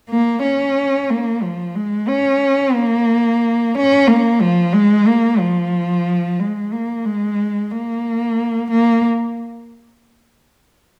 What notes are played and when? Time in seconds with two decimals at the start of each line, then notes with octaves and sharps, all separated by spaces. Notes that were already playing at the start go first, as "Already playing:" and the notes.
0.10 A#3
0.43 C#4
1.10 A#3
1.42 F3
1.75 G#3
2.08 C#4
2.75 A#3
3.75 C#4
4.08 A#3
4.41 F3
4.73 G#3
5.07 A#3
5.39 F3
6.39 G#3
6.72 A#3
7.05 G#3
7.71 A#3
8.71 A#3